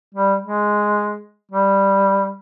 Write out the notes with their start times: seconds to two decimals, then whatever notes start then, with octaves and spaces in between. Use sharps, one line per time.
0.15 G3
0.42 G#3
1.52 G3